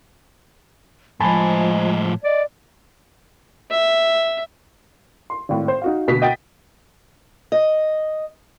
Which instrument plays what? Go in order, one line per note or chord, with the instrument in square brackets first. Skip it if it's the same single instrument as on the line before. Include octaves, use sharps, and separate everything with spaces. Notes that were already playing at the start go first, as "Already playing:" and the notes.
[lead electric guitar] A2 C5 [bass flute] F3 [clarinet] G#3 [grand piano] G#5 A5 B5
[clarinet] D5 [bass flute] D#5
[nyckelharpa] E5
[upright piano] C6
G#1 A2
C5
D#4 F#4 F5
D2 B2 B6
D#5 F#5 G5 A6
[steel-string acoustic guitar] D#5